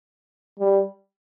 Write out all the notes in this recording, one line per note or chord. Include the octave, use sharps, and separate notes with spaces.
G3